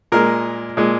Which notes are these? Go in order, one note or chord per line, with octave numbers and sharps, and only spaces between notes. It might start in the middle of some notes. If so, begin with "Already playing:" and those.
A#2 G#3 A#4
A#2 G#3